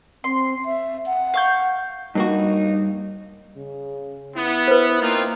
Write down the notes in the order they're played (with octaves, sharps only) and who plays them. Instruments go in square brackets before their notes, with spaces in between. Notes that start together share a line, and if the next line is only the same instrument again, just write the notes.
[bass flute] C4 [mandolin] C6
[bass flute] E5
F#5
[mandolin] F5 C#6 G6
[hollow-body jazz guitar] G2 A#3 F#4 [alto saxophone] D#4
[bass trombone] C#3
[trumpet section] B3 [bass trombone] E4
[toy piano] B4 C5
[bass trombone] A#3 [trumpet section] C4 D#4 F4